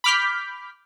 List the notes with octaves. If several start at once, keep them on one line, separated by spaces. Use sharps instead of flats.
B5 D6 F6 G6 B6